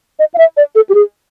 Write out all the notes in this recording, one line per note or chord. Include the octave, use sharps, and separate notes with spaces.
D#5
F5
E5
D5
A4
G4
G#4